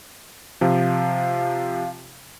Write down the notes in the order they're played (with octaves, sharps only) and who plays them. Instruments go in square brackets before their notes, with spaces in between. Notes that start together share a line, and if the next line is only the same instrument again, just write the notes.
[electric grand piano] C3 F3 [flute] F5